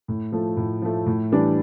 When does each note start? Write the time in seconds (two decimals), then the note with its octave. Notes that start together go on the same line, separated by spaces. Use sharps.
0.08 A2
0.32 F3 A3
0.57 A2
0.82 F3 A3
1.06 A2
1.32 E3 G3 D4